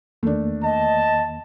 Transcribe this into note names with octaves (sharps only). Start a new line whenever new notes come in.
E2 D#3 A3 A#3 D4
D#5 A5